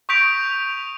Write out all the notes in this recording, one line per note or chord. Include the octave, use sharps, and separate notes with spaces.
C#6 D#6 G6 B6 D7 F7